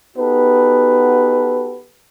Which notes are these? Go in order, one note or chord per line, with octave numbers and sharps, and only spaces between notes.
B3 D#4 F#4 G4 A4 B4